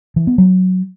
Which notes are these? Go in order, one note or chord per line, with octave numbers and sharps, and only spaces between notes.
E3
B3
F#3